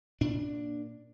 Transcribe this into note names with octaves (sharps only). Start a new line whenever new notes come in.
A#2 D4